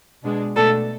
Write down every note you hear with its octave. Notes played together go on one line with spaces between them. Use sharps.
B2 G#3 D4
B2 A3 D4 A4